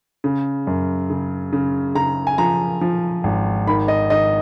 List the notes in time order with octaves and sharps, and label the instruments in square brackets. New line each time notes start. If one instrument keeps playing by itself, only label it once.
[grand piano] C#3
F#2
C#3
C#3
C#3 A#5
G#5
F3 A#5
F3
G#1
D#3 B5
D#5
D#3 D#5